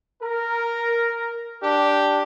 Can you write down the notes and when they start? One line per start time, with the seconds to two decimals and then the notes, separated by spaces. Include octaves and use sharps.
0.23 A#4
1.63 D4 G4